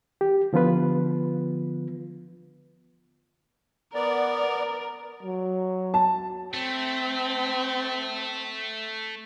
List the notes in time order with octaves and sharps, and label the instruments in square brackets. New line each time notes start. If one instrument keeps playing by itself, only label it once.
[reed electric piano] G4
D3 F3 B3 F4 B4
[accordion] B3 D5 [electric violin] A#4
[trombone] F#3
[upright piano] A5
[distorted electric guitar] A3 [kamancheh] C4